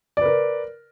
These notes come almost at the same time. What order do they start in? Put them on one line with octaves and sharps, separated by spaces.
D5 B4 A#4